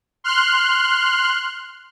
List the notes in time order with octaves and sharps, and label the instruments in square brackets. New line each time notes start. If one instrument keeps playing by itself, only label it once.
[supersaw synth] C6 F6 F#6